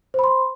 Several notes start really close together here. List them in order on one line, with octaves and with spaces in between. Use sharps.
C5 B5 C6